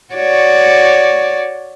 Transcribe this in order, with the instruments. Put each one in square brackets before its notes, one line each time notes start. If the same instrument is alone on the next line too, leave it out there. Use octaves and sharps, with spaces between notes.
[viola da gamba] F#4 C#5 D5